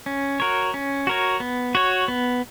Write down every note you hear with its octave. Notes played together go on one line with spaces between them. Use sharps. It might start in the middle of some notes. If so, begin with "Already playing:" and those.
C#4
F#4 A#4 C#5
C#4
F#4 A#4 C#5
B3
F#4 C#5
B3